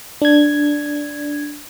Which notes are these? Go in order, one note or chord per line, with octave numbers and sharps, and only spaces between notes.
D4 G#6